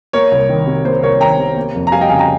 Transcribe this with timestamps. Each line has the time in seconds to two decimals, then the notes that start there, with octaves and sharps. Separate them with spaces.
0.13 A#3 A#4 C#5
0.31 C2
0.49 D#3
0.67 C3
0.85 A#3 C5
1.03 C2 A#4 C#5
1.20 D#3 G5 A#5
1.39 C3
1.56 A#3
1.74 F2
1.87 A#5
1.92 G3 F5 G#5
2.01 D#5 G5
2.10 C#3 F5 G#5
2.19 G5 A#5